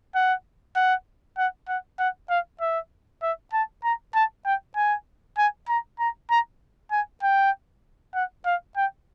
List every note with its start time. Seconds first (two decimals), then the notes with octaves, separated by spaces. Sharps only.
0.15 F#5
0.76 F#5
1.38 F#5
1.68 F#5
1.99 F#5
2.30 F5
2.61 E5
3.23 E5
3.53 A5
3.84 A#5
4.15 A5
4.46 G5
4.76 G#5
5.38 G#5
5.69 A#5
5.99 A#5
6.30 A#5
6.91 G#5
7.23 G5
8.15 F#5
8.46 F5
8.77 G5